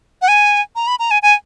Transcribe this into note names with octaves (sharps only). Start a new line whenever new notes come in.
F#5
G#5
A#5
B5
A#5
G#5
G#5